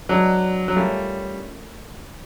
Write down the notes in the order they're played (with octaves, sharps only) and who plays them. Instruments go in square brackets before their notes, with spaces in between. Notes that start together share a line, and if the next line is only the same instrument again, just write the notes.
[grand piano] F#3 [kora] G#3 B3 D4
[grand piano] F#3
[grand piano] G3 [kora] A3 C#4 F4 A#4